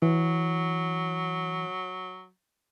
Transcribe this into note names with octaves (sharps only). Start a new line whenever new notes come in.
E3 F#3